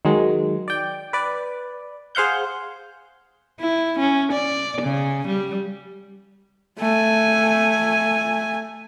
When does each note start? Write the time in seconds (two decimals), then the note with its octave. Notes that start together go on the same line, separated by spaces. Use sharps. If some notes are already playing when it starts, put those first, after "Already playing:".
0.05 D#3 F#3 G#3
0.68 D5 G5
1.13 B4 D5
2.15 G#4 C5 F5 F#5 G6
3.60 E4
3.98 C#4
4.32 D5
4.82 C#3
5.27 G3
6.79 A3 G#5